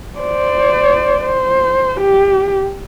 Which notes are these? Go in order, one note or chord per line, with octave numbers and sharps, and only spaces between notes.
C5 D5
C5
G4